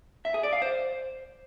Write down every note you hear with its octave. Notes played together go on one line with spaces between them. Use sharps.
E5
G#4
D5
F5
C5